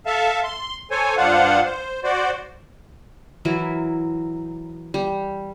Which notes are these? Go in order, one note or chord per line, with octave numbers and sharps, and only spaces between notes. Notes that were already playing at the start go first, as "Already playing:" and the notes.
A4 E5 F5 A5
C6
A4 C5 C#5 G#5
G2 D4 F4 C5 F5 F#5
C5
F#4 C5 D5
E3 F#3 E4 A#4
G3